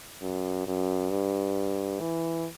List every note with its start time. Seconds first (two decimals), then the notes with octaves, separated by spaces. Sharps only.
0.21 F#2
0.67 F#2
1.10 G2
2.00 E3